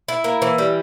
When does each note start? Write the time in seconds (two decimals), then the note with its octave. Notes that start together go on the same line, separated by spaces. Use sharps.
0.08 E4
0.24 A#3
0.42 E3
0.58 G3